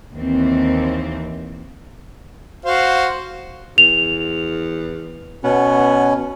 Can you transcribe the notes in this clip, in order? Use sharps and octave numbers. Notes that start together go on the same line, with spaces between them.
D#2 E3 C4
F#4 C5 F5
E2 F7
B2 B3 C#4